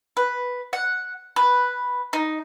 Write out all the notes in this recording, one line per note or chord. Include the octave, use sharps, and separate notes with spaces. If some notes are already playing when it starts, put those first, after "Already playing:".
B4
F#5
B4
D#4